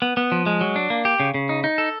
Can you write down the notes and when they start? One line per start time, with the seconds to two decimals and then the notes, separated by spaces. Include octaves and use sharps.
0.02 B3
0.17 B3
0.32 F3
0.46 G#3
0.61 F#3
0.76 D4
0.90 A#3
1.05 G4
1.20 C#3
1.34 C#3
1.49 D#4
1.64 D#4
1.78 A4